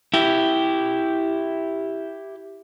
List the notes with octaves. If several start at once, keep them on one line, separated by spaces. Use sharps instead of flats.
E4 G4